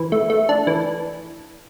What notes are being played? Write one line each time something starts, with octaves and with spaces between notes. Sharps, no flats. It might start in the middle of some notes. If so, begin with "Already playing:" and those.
Already playing: E3
A3
A3
D4
E3